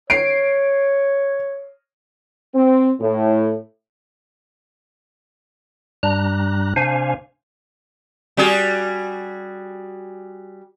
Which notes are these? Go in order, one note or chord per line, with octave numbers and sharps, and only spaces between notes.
C#5 C7 D7
C4
A2
G2 G3 D4 A#5 F#6
C3 D4 C5 F5 G#5
G3 F#4 G#4